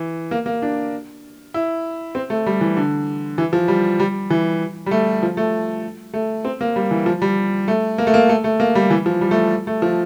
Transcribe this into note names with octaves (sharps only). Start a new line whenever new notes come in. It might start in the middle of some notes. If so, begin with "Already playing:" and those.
Already playing: E3
A#3
A#3
D4
E4
C4
A3
G3
E3
D3
E3
F3
G3
G3
E3
G3
A3
F3
A3
A3
C4
A#3
G3
E3
F3
G3
A3
A#3
A3
A#3
A3
A3
A#3
G3
E3
F3
G3
A3
A3
F3